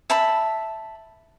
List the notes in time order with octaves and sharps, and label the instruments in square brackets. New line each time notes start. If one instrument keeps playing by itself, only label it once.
[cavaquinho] E5 A5 B5